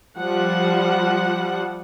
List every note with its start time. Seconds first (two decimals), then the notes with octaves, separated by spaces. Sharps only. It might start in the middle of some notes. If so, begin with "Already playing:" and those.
0.17 F3 G3 F#5